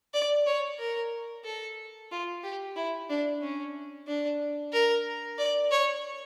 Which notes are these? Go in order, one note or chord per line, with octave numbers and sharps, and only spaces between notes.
D5
C#5
A#4
A4
F4
G4
E4
D4
C#4
D4
A#4
D5
C#5